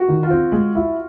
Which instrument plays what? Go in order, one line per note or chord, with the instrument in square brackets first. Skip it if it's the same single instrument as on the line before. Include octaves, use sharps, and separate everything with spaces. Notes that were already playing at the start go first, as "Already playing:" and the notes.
Already playing: [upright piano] F#4
[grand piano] D#3
[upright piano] F4
[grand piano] C4
G#3
E4